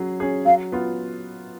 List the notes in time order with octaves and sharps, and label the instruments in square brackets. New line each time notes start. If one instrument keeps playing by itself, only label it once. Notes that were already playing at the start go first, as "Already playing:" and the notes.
Already playing: [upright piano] F#3 C#4 G#4
C#4 G#4
[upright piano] F#3 [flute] F5
[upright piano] B3 F4